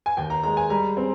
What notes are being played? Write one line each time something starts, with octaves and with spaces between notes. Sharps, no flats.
G#5
D#2 G5
A#5
G#3 A#5
G#5
G3 A#5
C4